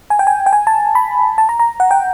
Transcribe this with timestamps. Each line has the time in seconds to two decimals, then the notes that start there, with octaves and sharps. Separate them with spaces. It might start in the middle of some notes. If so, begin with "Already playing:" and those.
0.10 G#5
0.19 G5
0.27 G#5
0.46 G5
0.53 G#5
0.67 A5
0.95 B5
1.38 A5
1.49 A#5
1.59 A#5
1.80 F#5
1.91 G5